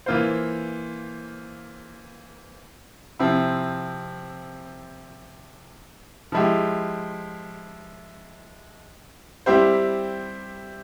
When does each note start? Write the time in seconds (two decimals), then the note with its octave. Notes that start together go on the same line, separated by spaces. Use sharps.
0.06 E3 A#3 F4 C5
3.19 C3 F3 C4 E4
6.32 F3 G#3 E4 G4
9.46 G3 C4 E4 G4 C5